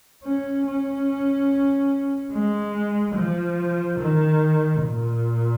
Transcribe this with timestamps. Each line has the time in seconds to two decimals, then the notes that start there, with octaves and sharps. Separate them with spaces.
0.25 C#4
0.67 C#4
2.33 G#3
3.16 F3
4.00 D#3
4.83 A#2